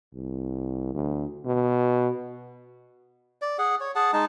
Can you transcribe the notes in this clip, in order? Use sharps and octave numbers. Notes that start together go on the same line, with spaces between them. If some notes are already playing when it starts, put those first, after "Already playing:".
C2
D2
B2
D5
G#4 F#5
C#5
G#4 F#5 A5
G#3 D#4 A5